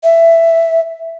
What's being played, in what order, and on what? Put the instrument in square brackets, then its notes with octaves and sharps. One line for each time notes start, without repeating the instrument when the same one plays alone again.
[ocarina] E5